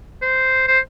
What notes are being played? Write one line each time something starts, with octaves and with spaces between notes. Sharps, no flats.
C5
C5